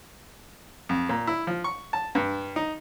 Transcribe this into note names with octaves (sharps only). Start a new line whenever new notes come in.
F2
A#2
E4
F3
C#6
A5
G2
D#4